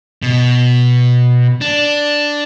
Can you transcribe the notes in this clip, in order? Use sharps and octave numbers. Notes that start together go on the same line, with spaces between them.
B2
D4